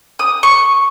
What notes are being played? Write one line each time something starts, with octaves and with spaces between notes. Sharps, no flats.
D#6
C#6